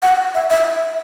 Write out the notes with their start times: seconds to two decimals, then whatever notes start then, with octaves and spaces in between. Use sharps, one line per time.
0.02 F#5
0.34 E5
0.50 E5